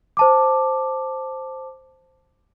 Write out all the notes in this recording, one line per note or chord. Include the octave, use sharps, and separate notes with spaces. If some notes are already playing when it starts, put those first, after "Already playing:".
C5 A5 D6